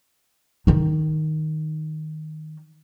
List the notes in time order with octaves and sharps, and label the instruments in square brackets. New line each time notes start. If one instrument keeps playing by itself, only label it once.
[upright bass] D#3 D#4